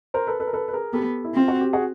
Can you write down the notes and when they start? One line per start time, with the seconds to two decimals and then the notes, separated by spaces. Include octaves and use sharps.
0.14 A#4 C5
0.27 A4 B4
0.40 A4 B4
0.47 A#4
0.53 A4 B4
0.68 B4
0.73 G#4 A#4
0.93 B3 G4 A4
1.24 E4
1.34 C4 F4
1.48 F#4
1.61 G4
1.73 F#4 G#4